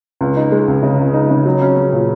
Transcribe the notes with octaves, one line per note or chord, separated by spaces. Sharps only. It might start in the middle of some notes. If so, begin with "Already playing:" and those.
C#2
D#4
G#3
C#2
C#3
C#2
D#4
C#3
F#3
C#4
C#4
A#2